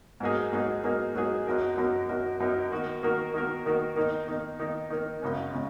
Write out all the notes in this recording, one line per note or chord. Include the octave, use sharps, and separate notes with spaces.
G#2 F#3 A#3 D#4 G#4
G#2 F#3 A#3 D#4 G#4
G#2 F#3 A#3 D#4 G#4
G#2 F#3 A#3 D#4 G#4
F#2 F#3 D#4 A#4
F#2 F#3 D#4 A#4
F#2 F#3 D#4 A#4
F#2 F#3 D#4 A#4
D#3 A#3 F#4 A#4
D#3 A#3 F#4 A#4
D#3 A#3 F#4 A#4
D#3 A#3 F#4 A#4
D#3 A#3 D#4
D#3 A#3 D#4
D#3 A#3 D#4
D#3 A#3 D#4
F#2 C#3 G#3 C#4
C#3 G#3